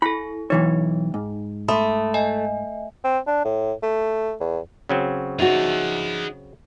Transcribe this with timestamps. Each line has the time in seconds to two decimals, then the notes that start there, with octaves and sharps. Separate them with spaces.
0.02 E4 A4 B5
0.50 B1 E3 D#4 C#5
1.14 G#2
1.68 A3 B5 C6 D#6
2.14 D#5 G#5
3.04 C4
3.27 D4
3.45 A2
3.83 A3
4.40 E2
4.89 C#3 F#3 C4
5.39 D#4 F#4 G#4 E5